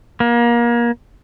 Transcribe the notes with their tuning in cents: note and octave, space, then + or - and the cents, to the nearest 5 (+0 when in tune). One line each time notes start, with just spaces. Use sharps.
A#3 +30